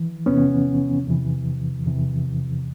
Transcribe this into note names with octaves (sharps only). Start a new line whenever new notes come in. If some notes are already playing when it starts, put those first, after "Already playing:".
Already playing: E3
E2 C3 E3 B3 C#4
E2 C3 E3
E2 C3 E3